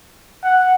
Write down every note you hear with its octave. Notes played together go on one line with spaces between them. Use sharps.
F#5